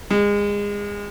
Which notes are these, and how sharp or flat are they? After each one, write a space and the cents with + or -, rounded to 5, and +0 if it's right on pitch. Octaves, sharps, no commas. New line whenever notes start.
G#3 -25